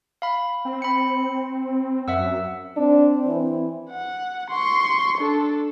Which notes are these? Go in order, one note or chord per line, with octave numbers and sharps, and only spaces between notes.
F5 B5
C4
B5 C#7
F#2 E5 F#5 E6
C4 D4
E3
F#5
C6 C#6
D4 A4